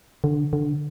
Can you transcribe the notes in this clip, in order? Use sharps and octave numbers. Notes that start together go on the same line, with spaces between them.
D3
D3